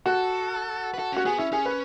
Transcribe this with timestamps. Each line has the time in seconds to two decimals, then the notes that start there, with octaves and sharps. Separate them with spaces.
0.06 F#4 A4
0.94 B4
0.99 A4
1.12 C#4 F#4
1.25 B3 G#4
1.39 C#4 E4
1.52 C#4 G#4
1.66 B4